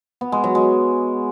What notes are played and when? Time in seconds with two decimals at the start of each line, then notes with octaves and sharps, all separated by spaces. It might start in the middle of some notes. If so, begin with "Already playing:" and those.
0.21 B3
0.32 G#3
0.44 F#3
0.55 G#3